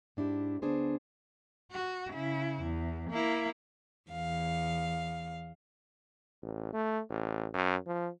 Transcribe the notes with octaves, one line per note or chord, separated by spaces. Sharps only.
G#2 D4 E4 G4
D2 D3 B3 D4 G#4 C5
F#4
C#3 E4
E2
A#3 E4
E2 F5
A1
A3
A1
F#2
F3